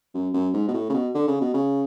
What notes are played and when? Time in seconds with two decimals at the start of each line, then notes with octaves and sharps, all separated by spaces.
0.14 F#2
0.34 F#2
0.54 G#2
0.68 B2
0.74 A2
0.90 C#3
0.94 B2
1.15 D3
1.28 C#3
1.41 B2
1.54 C#3